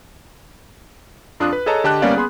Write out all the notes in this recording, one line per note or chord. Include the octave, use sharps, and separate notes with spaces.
F2 D4 F4 D#6 F#6
B4
G#4 A4 C#5 D#5 A5 A#5
D3 G4 D#5 A5 D6 F#6
G3 A#3 B3 C#4 D5 F5
B3 G#4 B5 C6